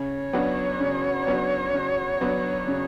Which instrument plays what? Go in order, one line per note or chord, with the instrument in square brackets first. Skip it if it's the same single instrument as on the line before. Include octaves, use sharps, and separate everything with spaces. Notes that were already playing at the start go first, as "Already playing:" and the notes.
Already playing: [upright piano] C#3 [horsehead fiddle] C#5
[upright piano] F#3 B3 D4 F#4
C#3
F#3 B3 D4 F#4
C#3
F#3 B3 D4 F#4
C#3